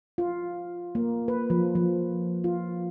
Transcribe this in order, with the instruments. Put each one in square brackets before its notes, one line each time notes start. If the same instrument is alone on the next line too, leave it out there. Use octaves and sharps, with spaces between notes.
[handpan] F4
A#3
B4
F3
F3
F4